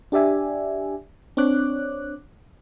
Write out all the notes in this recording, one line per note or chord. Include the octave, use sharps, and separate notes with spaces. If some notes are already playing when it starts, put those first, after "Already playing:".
D4 G4 D5 E5 G#5
C4 D4 C#5 D6 F#6